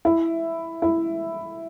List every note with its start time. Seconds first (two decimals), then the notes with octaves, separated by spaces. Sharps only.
0.05 E4
0.82 E4